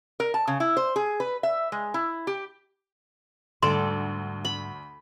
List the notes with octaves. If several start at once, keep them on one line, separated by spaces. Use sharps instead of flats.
A#4
A5
C#3
E4
C5
G#4
B4
E5
G#3
E4
G4
D2 G#2 G3 A4 D5 C6
B5